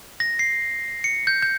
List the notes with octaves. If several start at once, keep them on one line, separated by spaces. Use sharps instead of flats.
A#6
C7
C#7
G6
G6